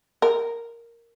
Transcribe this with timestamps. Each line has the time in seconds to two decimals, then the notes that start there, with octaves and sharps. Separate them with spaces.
0.22 A#4